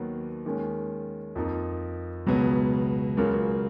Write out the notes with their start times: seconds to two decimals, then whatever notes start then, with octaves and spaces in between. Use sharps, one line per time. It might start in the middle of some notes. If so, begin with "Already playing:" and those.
Already playing: D#2 D#3 F#3 B3
0.45 D#2 D#3 G#3 C#4
1.35 F2 F3 A#3 D#4
2.26 C#2 B2 F#3 B3
3.17 C#2 C#3 F#3 A#3 F4